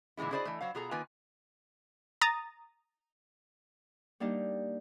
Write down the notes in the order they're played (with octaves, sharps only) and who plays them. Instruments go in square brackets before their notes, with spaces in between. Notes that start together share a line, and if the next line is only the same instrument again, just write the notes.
[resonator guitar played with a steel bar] A#2 D3 E3 G#3 E4
E4 F#4 G#4 C5 D5 D#5
E3 A3
F#3 C5 F5
B2 F4 G#4 A4 A#5
D#3 A#3 F4 B4 G#5
[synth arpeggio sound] A#5 D#6 A6
[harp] G3 A#3 D4 D#4 G4